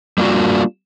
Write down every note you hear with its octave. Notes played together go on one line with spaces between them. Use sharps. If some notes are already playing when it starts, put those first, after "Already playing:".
G3 A#3 D4 F4 F#4